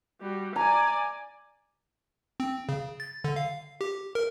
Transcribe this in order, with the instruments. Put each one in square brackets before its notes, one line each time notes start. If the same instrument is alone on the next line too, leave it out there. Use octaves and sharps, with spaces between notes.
[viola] G3 F#4
[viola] D5 G#5 [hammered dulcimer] A#5
[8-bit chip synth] C4
C#3
A6
D3
F5
G4
A#4